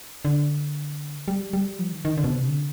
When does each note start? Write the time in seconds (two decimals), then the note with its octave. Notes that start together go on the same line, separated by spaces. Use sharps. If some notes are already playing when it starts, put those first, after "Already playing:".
0.25 D3
1.28 G3
1.53 G3
1.79 F3
1.92 D#3
2.05 D#3
2.18 D3
2.24 B2
2.31 C3
2.48 D3